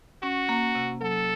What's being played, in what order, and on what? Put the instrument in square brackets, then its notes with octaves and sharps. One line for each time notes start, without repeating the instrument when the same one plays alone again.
[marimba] C#4 [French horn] F#4
[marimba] A#3
C3
[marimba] F#3 [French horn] A4